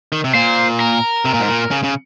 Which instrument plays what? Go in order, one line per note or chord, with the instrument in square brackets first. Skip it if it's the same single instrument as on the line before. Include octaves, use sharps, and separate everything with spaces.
[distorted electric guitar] D#3
C3
[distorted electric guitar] A#2 [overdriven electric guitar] C5
[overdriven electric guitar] A#4
[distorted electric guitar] C3
A#2
G#2
A#2
C#3
C#3